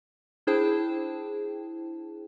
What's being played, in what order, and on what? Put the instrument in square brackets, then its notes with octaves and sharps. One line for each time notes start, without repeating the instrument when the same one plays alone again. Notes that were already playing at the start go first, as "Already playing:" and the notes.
[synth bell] D4 E4 G#4 C5 G5 A5